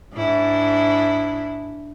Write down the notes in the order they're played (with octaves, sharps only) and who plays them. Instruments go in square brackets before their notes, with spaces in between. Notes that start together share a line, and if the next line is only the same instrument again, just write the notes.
[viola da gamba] G#2 D4 E4